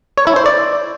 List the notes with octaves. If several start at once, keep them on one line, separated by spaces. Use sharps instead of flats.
C#5
E4
C5
D5